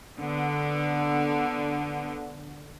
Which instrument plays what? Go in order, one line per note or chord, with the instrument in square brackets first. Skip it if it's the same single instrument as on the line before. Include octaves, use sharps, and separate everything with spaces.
[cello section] D3 B3